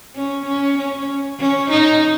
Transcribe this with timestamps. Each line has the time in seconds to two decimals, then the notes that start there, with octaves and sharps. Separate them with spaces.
0.15 C#4
0.46 C#4
0.78 C#4
1.39 C#4
1.71 D#4